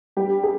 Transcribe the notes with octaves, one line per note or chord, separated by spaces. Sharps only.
G3 G4
G#4